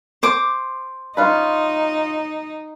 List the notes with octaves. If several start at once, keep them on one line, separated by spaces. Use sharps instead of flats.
C5 D6
C#4 D#4 F4 B4